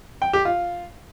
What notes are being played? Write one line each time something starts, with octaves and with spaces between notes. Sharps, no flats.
G5
G4
F4